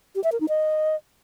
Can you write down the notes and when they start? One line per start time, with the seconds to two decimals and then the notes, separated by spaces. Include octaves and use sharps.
0.15 G4
0.24 E5
0.32 A#4
0.40 D#4
0.49 D#5